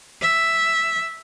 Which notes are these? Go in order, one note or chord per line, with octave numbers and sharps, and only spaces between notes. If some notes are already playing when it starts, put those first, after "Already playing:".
E5